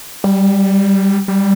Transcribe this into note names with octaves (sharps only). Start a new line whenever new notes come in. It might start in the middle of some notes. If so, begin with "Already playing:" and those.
G3
G3